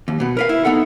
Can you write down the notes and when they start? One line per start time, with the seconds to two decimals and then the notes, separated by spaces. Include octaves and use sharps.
0.08 D#2
0.20 B2 B3
0.37 A#4 B4 F5
0.49 E4
0.65 B3 D#4 A4 F#5